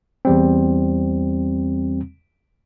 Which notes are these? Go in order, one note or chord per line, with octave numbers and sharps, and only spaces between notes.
E2 G3 C4